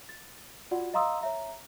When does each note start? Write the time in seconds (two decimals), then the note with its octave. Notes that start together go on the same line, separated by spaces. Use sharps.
0.09 A6
0.71 F4 F#4 D5 F#5
0.94 D#5 F5 A#5 C6 D#6 E6
1.21 C#5 E5 A#5